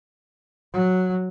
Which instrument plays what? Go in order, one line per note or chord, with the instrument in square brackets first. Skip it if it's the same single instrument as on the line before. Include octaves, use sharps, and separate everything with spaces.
[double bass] F#3